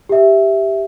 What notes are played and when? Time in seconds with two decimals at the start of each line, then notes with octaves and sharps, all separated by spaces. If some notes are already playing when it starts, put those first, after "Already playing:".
0.09 G4 E5